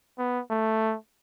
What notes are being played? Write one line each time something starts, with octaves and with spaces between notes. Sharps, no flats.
B3
A3